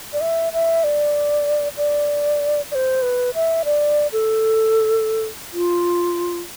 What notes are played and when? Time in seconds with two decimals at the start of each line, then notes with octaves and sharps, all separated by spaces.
0.13 D5
0.21 E5
0.53 E5
0.84 D5
1.77 D5
2.71 D5
2.75 C5
3.02 B4
3.34 E5
3.65 D5
4.13 A4
5.53 F4